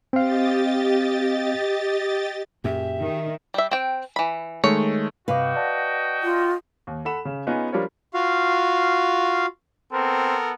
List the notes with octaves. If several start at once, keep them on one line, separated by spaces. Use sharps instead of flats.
C4 G4 D#5 F5 A6
F#2 A#2 G4 G#4 E5
D#3
G3 E5
C4 G5
E3 B5
D#3 G#3 A3 C#5
G2 C3 F#4 B4 D#5 F5 G5 D6
D5 F#5 A5
F4
D#2
A4 F#5 B5 E7
C#3
B3 C#4 D#4 F4 G#4 B4
F3 G3 D4 F4 A#4 C#5
F4 F#4 F5
B3 C4 A4 A#4